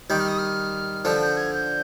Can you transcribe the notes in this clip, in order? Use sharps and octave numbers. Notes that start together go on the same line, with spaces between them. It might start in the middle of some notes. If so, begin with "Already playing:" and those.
D#3 G3 G6
F6
D#6
F6
D3 F3 G6
G6
G#6
G6